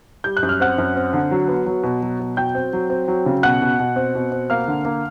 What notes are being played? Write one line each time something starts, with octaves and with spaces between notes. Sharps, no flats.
G3 G6
F#6
F#2
F6
C4 F#5 F#6
F#2
C4
D3
F#3
B3
F#3
B2
F#3
B2
F#3 G5 G6
C4
F#3
C4
F#3
C#3
B2 F#5 F#6
B2
B2
C4
B2
C4
A#3 F5 F6
D3
A#3